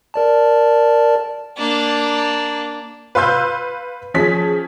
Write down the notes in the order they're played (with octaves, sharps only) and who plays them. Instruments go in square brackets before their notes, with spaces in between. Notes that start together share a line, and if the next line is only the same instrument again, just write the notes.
[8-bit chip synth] A#4 D5 A5
[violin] A#3 D4
[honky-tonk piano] B4 F5 C6 E6 G6
F3 C#4 G#4 B6